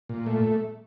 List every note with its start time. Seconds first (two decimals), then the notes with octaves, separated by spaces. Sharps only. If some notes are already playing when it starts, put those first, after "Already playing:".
0.09 A#2
0.26 A3